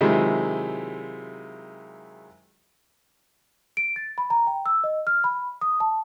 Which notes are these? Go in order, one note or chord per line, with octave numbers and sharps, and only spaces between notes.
C3 D#3 F#3 G#3 E4 F4
D7
A6
B5
A#5
G5
E6
D#5
F6
B5
D#6
A5